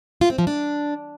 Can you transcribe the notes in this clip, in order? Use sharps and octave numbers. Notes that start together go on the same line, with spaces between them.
F4
C4
F3
D4